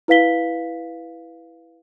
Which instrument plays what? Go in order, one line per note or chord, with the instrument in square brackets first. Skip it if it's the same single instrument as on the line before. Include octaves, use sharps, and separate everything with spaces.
[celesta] E4 B4 F5 B6 G7